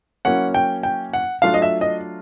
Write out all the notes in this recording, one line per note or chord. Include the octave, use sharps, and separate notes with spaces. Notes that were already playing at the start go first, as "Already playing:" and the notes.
F#3 A#3 C#4 E4 F#5
G5
G5
F#5
F#3 A3 D4 F4 F5
D#5
E5
D#5